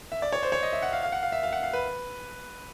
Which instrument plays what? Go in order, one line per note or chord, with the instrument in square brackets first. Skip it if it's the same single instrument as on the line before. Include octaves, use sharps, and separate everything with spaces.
[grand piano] E5
D5
C#5
C5
C#5
D#5
E5
F#5
F5
F5
F#5
F5
E5
F5
F#5
F5
B4